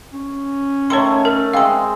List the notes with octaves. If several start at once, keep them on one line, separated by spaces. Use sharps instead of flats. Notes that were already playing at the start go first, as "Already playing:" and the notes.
C#4
D#3 A3 C#5 C6
A#4
G#3 C4 E5 F5 C6